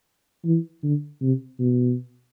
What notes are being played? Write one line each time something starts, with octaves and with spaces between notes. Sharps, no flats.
E3
D3
C3
B2